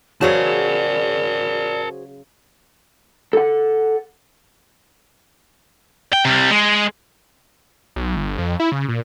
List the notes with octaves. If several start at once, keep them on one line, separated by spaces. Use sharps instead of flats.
C#3 F#3 F#4 G#4 A#4 C5 D5 A5
A4 F#5
G5
C3 G3
G#3
B1
G1
F2
E4
C#3
A#2